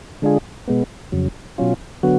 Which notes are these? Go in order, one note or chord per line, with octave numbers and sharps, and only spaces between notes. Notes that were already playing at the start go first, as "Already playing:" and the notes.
D3 G#3 D4 F4 G#4
B2 G#3 B3
F2 C#3 F#3
B2 F#3 C#4 F4
D3 F#3 B3 F#4